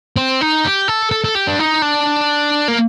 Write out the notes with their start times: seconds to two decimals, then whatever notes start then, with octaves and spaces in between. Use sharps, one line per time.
0.16 C4
0.41 D#4
0.65 G4
0.88 A4
1.11 A4
1.24 A4
1.35 G4
1.47 D4
1.59 D#4
1.82 D4
2.68 A#3